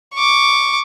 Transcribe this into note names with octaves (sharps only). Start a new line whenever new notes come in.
C#6 D6